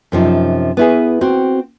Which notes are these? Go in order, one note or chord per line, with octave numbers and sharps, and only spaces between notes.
F#2 C3 F3 D#4
B3 E4 G#4
C4 F#4 G5